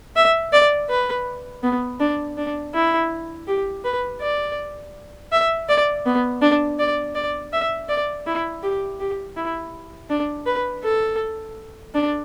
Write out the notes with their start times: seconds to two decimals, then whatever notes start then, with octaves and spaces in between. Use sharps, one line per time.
0.16 E5
0.52 D5
0.90 B4
1.63 B3
2.00 D4
2.38 D4
2.74 E4
3.48 G4
3.84 B4
4.21 D5
5.32 E5
5.69 D5
6.06 B3
6.41 D4
6.79 D5
7.15 D5
7.53 E5
7.88 D5
8.26 E4
8.63 G4
9.00 G4
9.37 E4
10.10 D4
10.46 B4
10.84 A4
11.94 D4